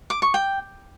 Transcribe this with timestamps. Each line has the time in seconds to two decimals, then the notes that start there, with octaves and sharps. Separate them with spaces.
0.10 D6
0.22 C#6
0.34 G5